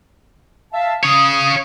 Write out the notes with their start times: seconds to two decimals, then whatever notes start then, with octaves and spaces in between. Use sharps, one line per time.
0.72 E5 F5 A5
1.03 C#3 C#5 C#6 D#6